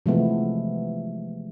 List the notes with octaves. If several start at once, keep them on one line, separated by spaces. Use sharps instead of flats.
C3 E3 F3 G#3 A3 B3